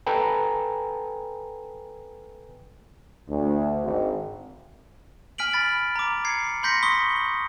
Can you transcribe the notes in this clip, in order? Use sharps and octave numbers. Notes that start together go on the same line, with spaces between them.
A4 B4 G5 G#5 A#5
D2
G#1
G#5 F6 B6 D7 F#7
B5 A6
A#5 D6
G#6 C7 C#7
B5 C6 G6 A#6 B6 C#7
C6 C#6 D#6 B6 G7